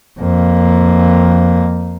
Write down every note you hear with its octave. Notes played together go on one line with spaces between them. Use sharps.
F2 A#3